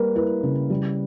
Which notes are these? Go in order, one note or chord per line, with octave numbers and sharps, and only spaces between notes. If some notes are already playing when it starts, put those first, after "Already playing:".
Already playing: G3 A#3 A#4 B4
E4 B4
C#3
G3